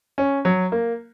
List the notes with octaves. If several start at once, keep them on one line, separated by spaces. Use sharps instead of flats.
C#4
F#3
A#3